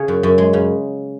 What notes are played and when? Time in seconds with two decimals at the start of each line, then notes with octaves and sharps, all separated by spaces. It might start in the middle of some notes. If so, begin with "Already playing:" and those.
Already playing: C#3 G#4
0.08 F#2
0.23 F#2
0.38 G#3
0.53 C#3